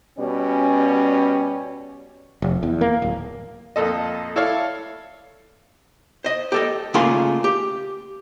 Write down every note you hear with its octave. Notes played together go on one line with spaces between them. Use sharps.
B2 G3 C#4
F1
E2
A#3
D1
F2 A#2 A4 D#5
E4 A4 C#5 D5 F5
C5 D#5
G4 A4 D#5
C#3 A3 A#3 F4 G#4 C6
G4